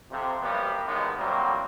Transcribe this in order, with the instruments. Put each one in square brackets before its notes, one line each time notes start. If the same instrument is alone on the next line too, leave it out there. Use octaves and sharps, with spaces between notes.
[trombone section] F2 C3
F#2 G3 A#3 B3 G4 B4
A1 D#3 G#3 B3 D#4
A1 F#3 G3 A#3 C4